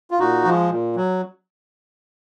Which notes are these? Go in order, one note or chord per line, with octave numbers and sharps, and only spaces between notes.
F4
A#2 D#4 F#4
F3 G#3
A#2
F#3